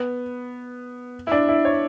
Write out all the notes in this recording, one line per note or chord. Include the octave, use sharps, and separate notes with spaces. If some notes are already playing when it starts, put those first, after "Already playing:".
Already playing: B3
E4
D4
E4
C#5